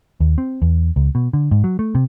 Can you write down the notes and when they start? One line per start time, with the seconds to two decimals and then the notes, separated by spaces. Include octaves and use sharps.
0.20 D#2
0.38 C4
0.62 E2
0.96 C#2
1.15 B2
1.33 D3
1.51 G#2
1.64 F#3
1.79 A3
1.95 C3